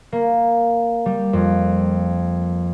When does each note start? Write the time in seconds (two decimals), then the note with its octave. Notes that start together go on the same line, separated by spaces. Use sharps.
0.12 A#3
1.06 G3
1.33 F2